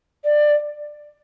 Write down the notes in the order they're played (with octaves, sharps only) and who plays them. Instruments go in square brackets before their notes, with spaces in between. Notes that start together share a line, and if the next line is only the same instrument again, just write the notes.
[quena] D5